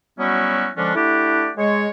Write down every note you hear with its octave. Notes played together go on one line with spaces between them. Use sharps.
F#3 G3 B3 C#4 E4 F#4
D3 F3 G#3 C#4 D4
A3 D4 E4 G4 D5 F#5
G#3 C#5